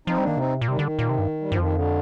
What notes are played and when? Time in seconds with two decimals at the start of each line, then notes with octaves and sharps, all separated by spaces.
0.07 F3 C4 D#4
0.18 G3
0.23 D#3 A#3 D4
0.37 C3 C4 D#4
0.62 A#2
0.68 C3 D#3 G3
0.79 D3
0.83 D#3
0.99 A#2
1.09 C3
1.19 G2
1.41 G3
1.50 G2 F3
1.59 F2 D#3
1.74 D3